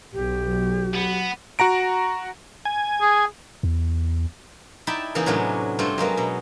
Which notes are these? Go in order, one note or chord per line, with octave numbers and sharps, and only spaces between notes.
B1 G4
F#3
B3
F#4 F#5 A#5 D7
G#5
G#4
E2
D#4 E4 D5 G5 A5 B5
C#3 E3 A#3 B3 D#4
A2 C3 F#3 B3 C#4 D4
G2 A3 C4 F4
F#3 G#3 A#3 B3
B2